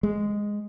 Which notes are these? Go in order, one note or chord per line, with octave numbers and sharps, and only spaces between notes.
G#3